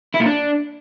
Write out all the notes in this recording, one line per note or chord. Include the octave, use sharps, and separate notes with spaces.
E4
A#2
D4